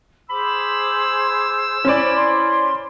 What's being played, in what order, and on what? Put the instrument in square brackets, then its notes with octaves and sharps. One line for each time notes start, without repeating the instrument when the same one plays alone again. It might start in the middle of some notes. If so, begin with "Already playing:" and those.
[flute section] G#4 C5 D6 [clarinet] B5 [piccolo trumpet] E6
[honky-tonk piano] C#4 C5 D5 [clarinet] E4 [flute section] G5 G#5 C#6
[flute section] C6